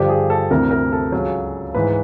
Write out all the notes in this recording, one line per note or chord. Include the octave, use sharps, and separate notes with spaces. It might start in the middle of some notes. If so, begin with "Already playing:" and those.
Already playing: G2 D3 F3 G4
G#4
A4
D2 C3 E3 A#4
A#4
A4
C#2 C#3 F#3
G#2 E3 B4